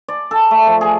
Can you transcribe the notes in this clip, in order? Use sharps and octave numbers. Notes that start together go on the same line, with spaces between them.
D5
A4
A3
F3
G#4